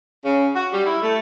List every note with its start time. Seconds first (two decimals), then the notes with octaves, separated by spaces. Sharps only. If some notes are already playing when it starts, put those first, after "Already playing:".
0.24 C#3
0.54 F#4
0.72 G3
0.85 E4
1.01 A3